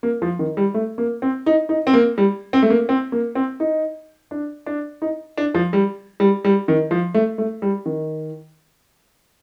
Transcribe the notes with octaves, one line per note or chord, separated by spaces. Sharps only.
A#3
F3
D#3
G3
A3
A#3
C4
D#4
D#4
C4
A#3
G3
C4
A3
A#3
C4
A#3
C4
D#4
D4
D4
D#4
D4
F3
G3
G3
G3
D#3
F3
A3
A3
G3
D#3